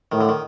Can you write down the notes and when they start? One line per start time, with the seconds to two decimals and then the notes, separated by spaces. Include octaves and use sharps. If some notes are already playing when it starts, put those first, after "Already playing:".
0.12 A2 D#3
0.21 D3
0.29 D#3